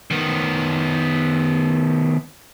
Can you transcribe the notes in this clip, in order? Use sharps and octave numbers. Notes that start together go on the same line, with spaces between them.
D#3 B3